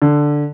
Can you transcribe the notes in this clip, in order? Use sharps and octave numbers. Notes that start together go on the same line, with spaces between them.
D3